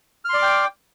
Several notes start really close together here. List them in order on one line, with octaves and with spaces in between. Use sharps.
F6 C6 D5 D6 G5